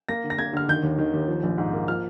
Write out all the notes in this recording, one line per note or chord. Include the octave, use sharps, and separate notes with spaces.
A#3 A#6
D3
A#6
A#3 G#6
D3 F6
D#3 G6
D#2
D#3
D#2
F3
A#1
G#2
A#3
F3 F6